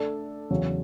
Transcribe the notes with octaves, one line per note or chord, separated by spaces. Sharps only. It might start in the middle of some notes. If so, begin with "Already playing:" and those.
Already playing: A3 D4 A4 D5
E2 C#3 F#3